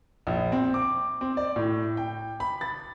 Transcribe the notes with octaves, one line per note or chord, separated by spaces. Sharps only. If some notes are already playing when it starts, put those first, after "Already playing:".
A#1
C4
D6
C4
D5
A2
G5
B5
A6